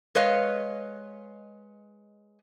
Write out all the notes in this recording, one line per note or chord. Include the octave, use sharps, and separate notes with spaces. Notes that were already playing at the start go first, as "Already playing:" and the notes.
G#3 B4 C#5 D#5 F5